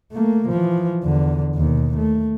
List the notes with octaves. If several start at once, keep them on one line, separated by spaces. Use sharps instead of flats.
A3 A#3
E3 F3
E2 D3
D#2 B2
A3